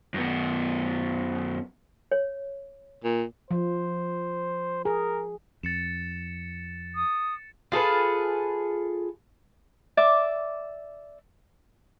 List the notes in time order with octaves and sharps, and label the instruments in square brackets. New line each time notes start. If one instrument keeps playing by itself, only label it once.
[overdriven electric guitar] F#2 B3
[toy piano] C#5
[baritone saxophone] A#2
[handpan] F3 [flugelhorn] C5
[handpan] G#4 [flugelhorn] A#4
[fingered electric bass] F2 [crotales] A6 C#7 E7
[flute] D#6
[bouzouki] F4 G#4 A4 B4
[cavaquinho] D5 E5 D6